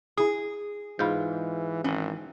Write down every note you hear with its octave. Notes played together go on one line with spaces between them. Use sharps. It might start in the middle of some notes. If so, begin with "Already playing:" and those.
E4 G#4 D#6
G#2 E3 F4 B5 G6
G#1 E3 C#4